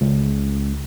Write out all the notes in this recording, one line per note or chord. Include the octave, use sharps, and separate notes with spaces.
C#2